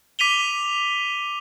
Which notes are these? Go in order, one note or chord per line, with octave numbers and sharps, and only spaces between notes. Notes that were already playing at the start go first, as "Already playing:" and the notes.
D6 B6 D#7 F7 G7